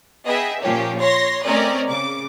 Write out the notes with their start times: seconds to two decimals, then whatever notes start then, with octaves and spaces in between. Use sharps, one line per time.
0.25 B3 G#4 D#5 E5 G5
0.61 A#2 F3 A#3 C#4 G4
0.98 C#5 C6 A#6
1.44 A3 C4 C#4 A#4 D5 D#5
1.88 C#3 D6